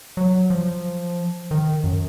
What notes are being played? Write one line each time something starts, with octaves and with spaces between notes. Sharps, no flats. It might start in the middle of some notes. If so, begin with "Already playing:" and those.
F#3
F3
D#3
F#2